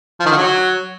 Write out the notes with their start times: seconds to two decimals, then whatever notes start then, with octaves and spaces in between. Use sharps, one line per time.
0.20 F3
0.26 D#3
0.32 D3
0.37 F#3